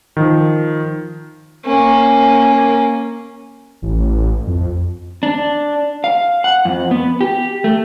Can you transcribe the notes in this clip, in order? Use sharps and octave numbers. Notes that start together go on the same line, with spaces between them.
D#3 F3
A#3 C#4
A1
F2
D4
F5
F#5
F2
B3
G4
A3